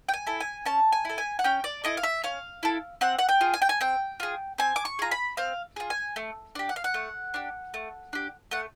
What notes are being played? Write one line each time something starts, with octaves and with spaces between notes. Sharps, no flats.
G5
G#5
E4 A4
G#5
C#4 A5
G#5
E4 A4
G#5
F#5
C#4 G5
D5
E4 A4 D#5
F5
E5
C#4 F5
E4 A4
C4 F#5
F#5
G5
F4 G#4
G#5
G5
G#5
C4 G5
F4 G#4
C4 G#5
D6
C#6
F4 G#4 A#5
B5
C4 F5
F4 G#4
G#5
A3
D4 G4
F#5
F5
F#5
A3
D4 G4
A3
D4 G4
A3 F#5